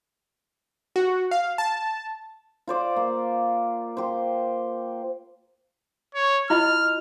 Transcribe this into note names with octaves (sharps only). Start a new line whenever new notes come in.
F#4
F5
A5
F4 C5 D5
A#3
G4 C5
C#5
E4 F4 D#5 F6